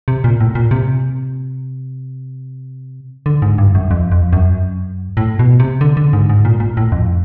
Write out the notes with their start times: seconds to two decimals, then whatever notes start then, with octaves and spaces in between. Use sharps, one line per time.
0.08 C3
0.24 A#2
0.40 A2
0.55 A#2
0.71 C3
3.26 D3
3.42 G#2
3.58 G2
3.75 F#2
3.91 F2
4.12 F2
4.33 F#2
5.17 A2
5.39 B2
5.60 C3
5.81 D3
5.97 D3
6.13 G#2
6.29 G#2
6.45 A#2
6.60 A#2
6.77 A2
6.92 F2